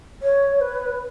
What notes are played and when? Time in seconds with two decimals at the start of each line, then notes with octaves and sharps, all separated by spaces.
0.22 C#5
0.60 B4